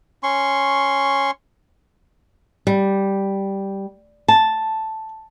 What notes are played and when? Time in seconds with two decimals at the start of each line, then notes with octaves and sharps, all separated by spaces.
0.23 C#4 C6 C#6
2.67 G3
4.28 A5